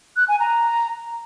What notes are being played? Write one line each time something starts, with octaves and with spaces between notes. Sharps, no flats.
F#6
G#5
A#5